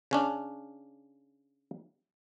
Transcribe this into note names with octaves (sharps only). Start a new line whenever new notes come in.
C#3 C#4 D4